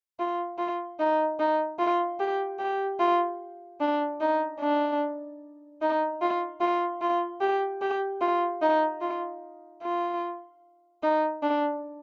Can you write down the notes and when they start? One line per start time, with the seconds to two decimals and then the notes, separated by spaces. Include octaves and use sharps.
0.19 F4
0.58 F4
0.99 D#4
1.40 D#4
1.79 F4
2.20 G4
2.59 G4
3.00 F4
3.80 D4
4.21 D#4
4.60 D4
5.81 D#4
6.21 F4
6.60 F4
7.01 F4
7.41 G4
7.81 G4
8.21 F4
8.62 D#4
9.01 F4
9.83 F4
11.03 D#4
11.43 D4